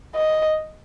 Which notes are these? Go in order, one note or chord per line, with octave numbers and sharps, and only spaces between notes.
D#5